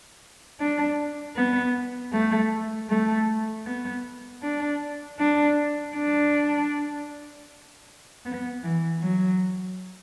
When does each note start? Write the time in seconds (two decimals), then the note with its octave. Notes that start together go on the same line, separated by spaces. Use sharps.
0.60 D4
1.36 B3
2.13 A3
2.90 A3
3.66 B3
4.43 D4
5.19 D4
5.95 D4
8.25 B3
8.63 E3
9.01 F#3